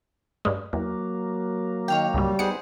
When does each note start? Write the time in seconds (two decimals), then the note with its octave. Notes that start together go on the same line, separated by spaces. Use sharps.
0.45 G2 G#3
0.73 E2 F#3 A#3
1.88 D#3 C#5 F5 G5
2.14 C#2 G#2 G3
2.39 B3 D#4 G#4 C5 F#5 C#7